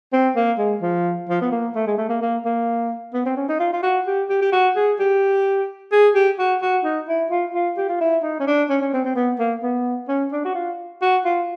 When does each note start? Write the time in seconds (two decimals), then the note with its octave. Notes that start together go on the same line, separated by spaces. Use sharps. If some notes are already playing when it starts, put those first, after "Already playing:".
0.13 C4
0.36 A#3
0.58 G#3
0.82 F3
1.29 F3
1.42 B3
1.52 A#3
1.75 A3
1.87 G#3
1.97 A3
2.09 A#3
2.21 A#3
2.45 A#3
3.13 B3
3.25 C4
3.37 C#4
3.49 D#4
3.59 F4
3.73 F4
3.83 F#4
4.07 G4
4.29 G4
4.42 G4
4.52 F#4
4.76 G#4
4.99 G4
5.92 G#4
6.15 G4
6.39 F#4
6.61 F#4
6.84 D#4
7.08 E4
7.30 F4
7.54 F4
7.77 G4
7.89 F4
8.00 E4
8.23 D#4
8.40 C#4
8.47 D4
8.69 C#4
8.81 C#4
8.93 C4
9.05 C4
9.15 B3
9.39 A#3
9.63 B3
10.08 C#4
10.32 D4
10.45 F#4
10.54 F4
11.02 F#4
11.25 F4